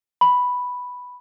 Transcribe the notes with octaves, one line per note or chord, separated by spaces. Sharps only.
B5